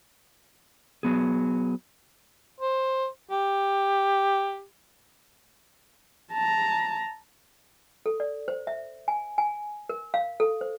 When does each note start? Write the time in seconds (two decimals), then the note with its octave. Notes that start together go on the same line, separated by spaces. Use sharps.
1.03 F#3 B3 G#4
2.60 C5
3.31 G4
6.31 A5 A#5
8.06 A4
8.20 D5
8.48 C5
8.67 E5
9.08 G#5
9.38 G#5
9.89 A#4
10.14 F5
10.40 A4
10.61 C5